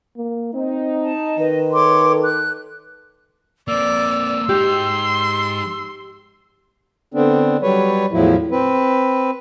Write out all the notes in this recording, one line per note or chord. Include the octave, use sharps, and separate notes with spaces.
A#3
C4 D#4
A5
D#3 B4 D#5
A4 C#5 C6 D6
F#6
A#3 C4 D5 E6
G#3 D#4 G4 C6
D3 B3 C4 D4
F#3 G3 B4 C#5
E2 A2 F3 F#3 E4
C4 B4